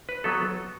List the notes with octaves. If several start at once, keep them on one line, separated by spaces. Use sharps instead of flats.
B4
F#3 B3 A4